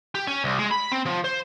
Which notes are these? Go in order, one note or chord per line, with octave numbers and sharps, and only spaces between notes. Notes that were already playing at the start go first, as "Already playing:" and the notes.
G4
C#4
C2
G#3
B5
C4
F3
C5